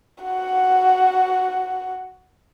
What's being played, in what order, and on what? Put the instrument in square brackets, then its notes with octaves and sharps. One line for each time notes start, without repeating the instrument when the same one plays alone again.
[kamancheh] F#4 F#5